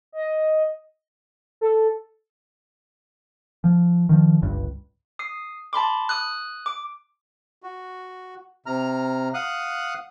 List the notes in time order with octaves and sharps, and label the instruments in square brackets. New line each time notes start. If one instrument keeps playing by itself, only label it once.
[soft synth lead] D#5
[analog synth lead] A4
[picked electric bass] F3
D#3 F3
G1 C#2 G2
[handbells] D#6 C7
A5 B5 C6 D6
D#6 F#6
D6 D7
[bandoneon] F#4
C3 A#5 F6
F5 F#5 D#6 F#6